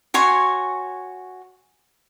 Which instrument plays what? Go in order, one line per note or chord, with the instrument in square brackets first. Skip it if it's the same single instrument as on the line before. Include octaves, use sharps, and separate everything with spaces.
[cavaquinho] F#4 C#5 G#5 C6